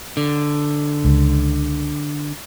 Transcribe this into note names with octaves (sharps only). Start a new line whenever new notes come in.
D3
C#2